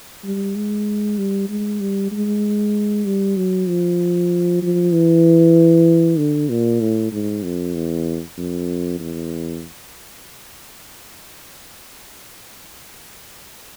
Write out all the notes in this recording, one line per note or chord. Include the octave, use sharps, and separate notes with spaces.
G3
G#3
G3
G#3
G3
G#3
G3
F#3
F3
F3
E3
D3
A#2
A2
G#2
F2
E2
F2
E2